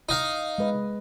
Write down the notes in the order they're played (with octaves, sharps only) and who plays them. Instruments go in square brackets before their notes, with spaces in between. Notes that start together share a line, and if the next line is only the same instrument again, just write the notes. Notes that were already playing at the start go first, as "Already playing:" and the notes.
[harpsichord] D#4 F5
[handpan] G#3 B4 D#5